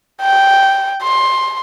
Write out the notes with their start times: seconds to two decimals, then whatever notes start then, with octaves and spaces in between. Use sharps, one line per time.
0.22 G5
1.03 C6